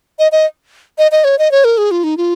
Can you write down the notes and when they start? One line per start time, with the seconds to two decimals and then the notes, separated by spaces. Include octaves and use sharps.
0.19 D#5
0.32 D#5
0.98 D#5
1.12 D#5
1.24 C#5
1.39 D#5
1.51 C#5
1.64 A#4
1.78 G#4
1.91 F4
2.04 D#4
2.17 F4